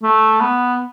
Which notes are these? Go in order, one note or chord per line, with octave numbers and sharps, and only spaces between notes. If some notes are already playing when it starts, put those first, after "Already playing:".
A3
B3